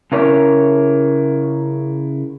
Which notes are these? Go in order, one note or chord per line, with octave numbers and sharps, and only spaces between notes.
C#3 E4 A#4 C#5